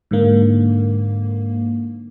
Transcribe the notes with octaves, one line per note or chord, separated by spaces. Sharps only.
G#2 D3 A#3